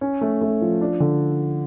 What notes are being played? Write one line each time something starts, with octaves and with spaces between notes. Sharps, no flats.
C#4
A3
A3
F3
D4
D3